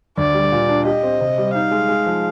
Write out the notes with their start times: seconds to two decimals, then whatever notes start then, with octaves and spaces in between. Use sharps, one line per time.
0.18 D2 D5
0.34 G3
0.52 A#2
0.69 D4
0.85 G4 D#5
1.03 C4
1.21 C3
1.38 G3
1.54 D#4 F5
1.71 G#3
1.89 G#3
2.06 F3